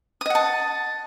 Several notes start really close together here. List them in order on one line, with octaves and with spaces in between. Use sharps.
D#6 D#5 F#5 A5